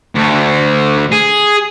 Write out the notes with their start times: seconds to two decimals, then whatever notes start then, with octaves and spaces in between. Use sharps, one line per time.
0.15 D2
1.12 G#4